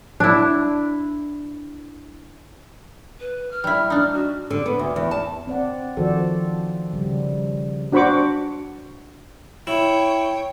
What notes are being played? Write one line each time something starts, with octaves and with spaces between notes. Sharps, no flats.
D4 E4
B4
F6
G3 E4
D4 D#4
F#4
D3
B3
D2
E2
A5
C4 D5 F#5
D#3 F3 F#4 A4 C5 D5
C#3 G3
D4 F#4 C5 B5 C#6 D6
E4 C#5 G5